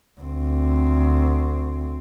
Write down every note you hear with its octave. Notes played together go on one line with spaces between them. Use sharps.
D2 C4